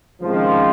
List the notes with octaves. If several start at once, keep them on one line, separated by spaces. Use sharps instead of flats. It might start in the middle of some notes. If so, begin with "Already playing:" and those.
C#2 C3 D#3 F3